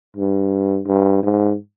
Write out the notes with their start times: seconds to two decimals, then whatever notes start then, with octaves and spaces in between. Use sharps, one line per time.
0.17 G2
0.87 G2
1.23 G#2